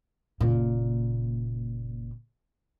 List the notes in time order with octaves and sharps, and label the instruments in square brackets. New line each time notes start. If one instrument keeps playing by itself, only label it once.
[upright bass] F#1 A#2